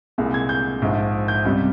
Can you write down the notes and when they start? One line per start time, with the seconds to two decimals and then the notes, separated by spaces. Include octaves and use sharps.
0.18 C2 A#2 G#3
0.34 G#6
0.49 G6
0.82 A#1 G#2 F3
1.28 G6
1.44 C#2 C3 G3